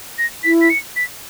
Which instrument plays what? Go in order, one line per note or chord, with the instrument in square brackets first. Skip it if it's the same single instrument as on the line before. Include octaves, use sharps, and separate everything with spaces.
[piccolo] A#6
[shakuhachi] E4 [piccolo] B6
[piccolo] B6
C#7
B6